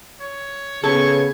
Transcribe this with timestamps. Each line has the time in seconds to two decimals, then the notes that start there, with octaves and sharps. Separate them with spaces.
0.20 C#5
0.84 C#3 B3 A4 C#6 G#6